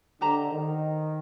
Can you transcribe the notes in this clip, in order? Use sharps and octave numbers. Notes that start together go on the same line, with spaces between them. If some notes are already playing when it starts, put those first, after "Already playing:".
D3 G4 C5 D#5 A#5
D#3